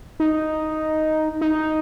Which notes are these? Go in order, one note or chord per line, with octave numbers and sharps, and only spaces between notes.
D#4
D#4